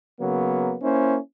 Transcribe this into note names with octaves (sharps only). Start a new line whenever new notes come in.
C#3 F#3 A#3 B3
A#3 C#4 E4 C5